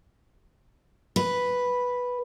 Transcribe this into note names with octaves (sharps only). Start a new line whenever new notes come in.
B4